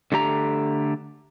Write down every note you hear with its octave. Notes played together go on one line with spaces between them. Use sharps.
D3 A3 G4 A#5